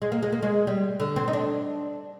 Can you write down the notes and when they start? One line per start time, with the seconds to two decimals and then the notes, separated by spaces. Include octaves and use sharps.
0.02 G#3
0.12 A#3
0.23 G#3
0.33 A#3
0.43 G#3
0.67 G3
1.00 D3
1.16 C4
1.28 D#4
1.33 D4